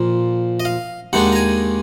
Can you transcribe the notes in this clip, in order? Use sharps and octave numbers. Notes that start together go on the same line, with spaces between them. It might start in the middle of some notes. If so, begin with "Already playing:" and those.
Already playing: A#2 F3 A#3 F4
D#5
F5
D#2 D#3 G#3 D4 F#5
A#5
G#5